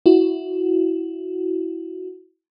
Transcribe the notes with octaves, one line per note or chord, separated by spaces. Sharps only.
E4 F#4